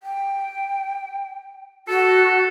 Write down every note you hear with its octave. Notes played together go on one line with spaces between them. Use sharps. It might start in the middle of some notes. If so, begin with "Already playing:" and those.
G5
F#4 A4